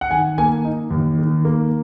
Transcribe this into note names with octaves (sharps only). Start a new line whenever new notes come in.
F#5
D#3 G#5
A#3 G#5
D#4
D#2
D#3
A#3